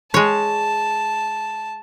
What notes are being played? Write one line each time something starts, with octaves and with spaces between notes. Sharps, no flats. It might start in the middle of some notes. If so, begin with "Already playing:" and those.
G#3 C#5 A5